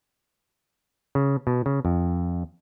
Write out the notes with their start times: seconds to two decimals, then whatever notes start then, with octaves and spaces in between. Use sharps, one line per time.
1.15 C#3
1.47 B2
1.66 C#3
1.85 F2